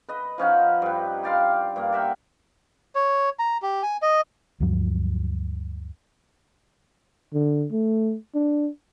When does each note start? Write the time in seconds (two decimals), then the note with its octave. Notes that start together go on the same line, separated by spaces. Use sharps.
0.09 B4 D#5
0.38 F3 C#4 D#4 F#5
0.82 G2 B4
1.23 G4 D5 F5 C6
1.76 G2 A#3
1.92 A#4 E5 F#5 G5
2.95 C#5
3.39 A#5
3.62 G4
3.83 G#5
4.02 D#5
4.60 D2 G2 F3 F#3
7.34 D3
7.72 A3
8.35 D4